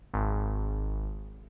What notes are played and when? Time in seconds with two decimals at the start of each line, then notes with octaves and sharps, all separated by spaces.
0.14 G#1